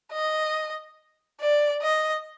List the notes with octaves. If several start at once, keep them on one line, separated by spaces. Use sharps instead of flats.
D#5
D5
D#5